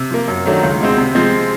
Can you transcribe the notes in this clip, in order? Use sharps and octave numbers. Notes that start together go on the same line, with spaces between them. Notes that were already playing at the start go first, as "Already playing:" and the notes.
Already playing: C3
F3 A#3
F#2
D#3 F#3 A3 D4
C#2
B2 G#3 C4
C3
F3 G#3 C4